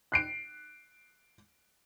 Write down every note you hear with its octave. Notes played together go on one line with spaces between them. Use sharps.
F#6 C7 D7